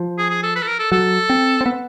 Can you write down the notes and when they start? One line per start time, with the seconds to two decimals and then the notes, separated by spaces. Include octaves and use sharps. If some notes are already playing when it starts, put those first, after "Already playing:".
Already playing: F3
0.18 G#4
0.31 G#4
0.43 A4
0.56 B4
0.63 A4
0.68 A#4
0.80 A4
0.92 F#3 A4
1.30 C4
1.61 C4
1.66 B3